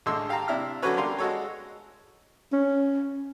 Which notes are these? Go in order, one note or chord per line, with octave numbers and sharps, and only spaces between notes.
A1 D3 G#3 C6 E6
G4 F5 G5 A5 A#5
C3 D4 E4 E5 F6
D3 F#3 C#4 F#4 B4 C#5
D3 G3 A#4 F5 C6
G#3 F#4 A4 C#5
C#4